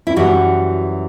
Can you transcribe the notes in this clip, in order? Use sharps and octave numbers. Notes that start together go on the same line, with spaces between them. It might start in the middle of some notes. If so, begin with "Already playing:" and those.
E4
F#2 E3 G3 F#4